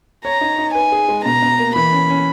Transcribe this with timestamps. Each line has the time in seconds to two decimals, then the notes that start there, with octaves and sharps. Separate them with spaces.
0.25 C#5 A#5
0.41 D#4
0.58 D#4
0.74 B4 G#5
0.92 G#4
1.09 G#3
1.25 B2 A#5
1.42 B2
1.59 A#3
1.76 E3 B5
1.92 C#4
2.10 C#4